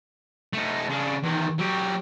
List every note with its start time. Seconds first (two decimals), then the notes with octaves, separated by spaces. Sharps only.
0.53 A3 D#4
0.89 C#3 D4
1.23 E2 D#3
1.58 F#3 G4